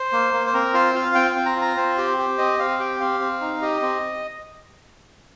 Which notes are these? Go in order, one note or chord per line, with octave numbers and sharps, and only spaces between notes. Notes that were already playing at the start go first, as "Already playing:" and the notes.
Already playing: C5
A#3
A#3
C5
C4 A#4
F4 C5
F4 F5
C4 G5
C4 G5
A#5
F4
A#5
C4 C5
G4
G4
C4 D#5
C4 F5
G4 G5
C4 F5
C4
D#4
G4 D#5
C4